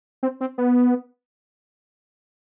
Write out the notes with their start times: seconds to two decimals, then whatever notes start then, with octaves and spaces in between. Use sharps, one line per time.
0.23 C4
0.41 C4
0.58 B3